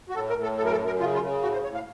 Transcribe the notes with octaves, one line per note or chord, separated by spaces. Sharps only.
F#4
A2 A4
A#4
A2
A4
F#2 A4
A#4
A4
F#2
A#4
C#3 F4
F4
C#3
A2 F#4
C5
A2 C#5
F5